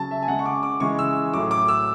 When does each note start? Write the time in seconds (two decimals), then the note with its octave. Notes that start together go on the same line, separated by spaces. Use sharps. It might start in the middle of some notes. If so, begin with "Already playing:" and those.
Already playing: C#3 F#3 A5
0.11 E5
0.22 G#5
0.28 C#3 G#3 F#5
0.39 C#6
0.46 D6
0.63 D6
0.80 C#3 E3 G#3 C#6
0.99 E6
1.33 F#3 D6
1.37 A2
1.51 D6
1.68 E6